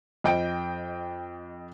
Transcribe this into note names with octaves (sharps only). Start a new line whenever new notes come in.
F2 D#5 G5 G6 D7